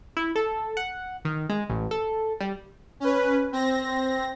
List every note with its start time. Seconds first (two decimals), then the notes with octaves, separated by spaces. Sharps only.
0.17 E4
0.36 A4
0.77 F#5
1.25 D#3
1.49 G#3
1.70 A1
1.91 A4
2.41 G3
3.00 C#4 B4
3.52 C4 A#6